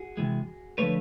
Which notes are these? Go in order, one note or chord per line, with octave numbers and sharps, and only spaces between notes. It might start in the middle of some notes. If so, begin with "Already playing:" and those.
Already playing: F#4 G#4
C3 E3 G#3
D3 F3 A3 B4 C#5